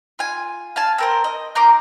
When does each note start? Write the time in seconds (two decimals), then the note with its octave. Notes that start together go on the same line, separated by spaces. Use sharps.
0.19 F4 G#5
0.76 F5 G#5 A5
0.98 C4 A#4 C5
1.24 D#5
1.55 D#4 A#4 C6 D6